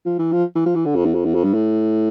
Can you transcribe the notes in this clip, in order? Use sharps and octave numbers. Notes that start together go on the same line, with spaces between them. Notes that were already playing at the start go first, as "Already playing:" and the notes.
F3
E3
F3
E3
F3
E3
D3
F2
E2
F2
E2
F2
G2
A2